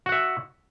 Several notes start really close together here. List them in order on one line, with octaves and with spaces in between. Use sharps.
F#4 F#5 E5